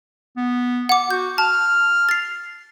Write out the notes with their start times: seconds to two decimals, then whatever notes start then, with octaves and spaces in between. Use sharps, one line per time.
0.37 B3
0.89 F#5 D6
1.11 F#4 G6
1.38 A5 F6
2.09 A6 C7